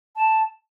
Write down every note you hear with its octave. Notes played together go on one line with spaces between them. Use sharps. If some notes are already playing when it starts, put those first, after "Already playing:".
A5